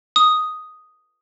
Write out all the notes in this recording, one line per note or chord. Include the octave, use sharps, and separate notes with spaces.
D#6